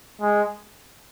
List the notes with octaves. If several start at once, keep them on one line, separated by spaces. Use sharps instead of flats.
G#3